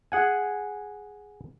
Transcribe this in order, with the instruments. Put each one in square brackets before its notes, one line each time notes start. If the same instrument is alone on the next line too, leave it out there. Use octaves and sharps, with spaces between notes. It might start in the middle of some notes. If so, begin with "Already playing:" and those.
[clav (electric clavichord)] G#4 F#5 G#5